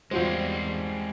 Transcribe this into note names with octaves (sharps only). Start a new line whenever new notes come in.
E2 G3 G#3 C4 F4 F#4 C5